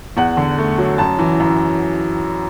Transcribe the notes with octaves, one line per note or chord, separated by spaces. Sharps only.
E2 F#5
D3
A3
F#3
F#2 A5
E3
F#2